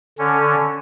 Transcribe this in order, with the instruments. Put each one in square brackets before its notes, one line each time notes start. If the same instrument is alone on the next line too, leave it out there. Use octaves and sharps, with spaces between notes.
[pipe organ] D3 C#4